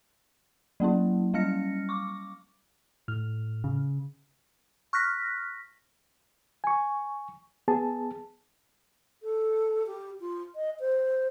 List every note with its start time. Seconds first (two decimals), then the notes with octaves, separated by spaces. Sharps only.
0.80 F#3 A#3 C#4 E4
1.34 G3 C#4 F5 F6 A#6 C#7
1.89 C#6 D6
3.08 A2 F6
3.64 C#3
4.93 C#6 F6 F#6 A#6 B6
6.64 G#5 C#6
7.68 B3 G#4 A5
9.22 A4
9.86 G4
10.20 F4
10.55 D#5
10.80 C5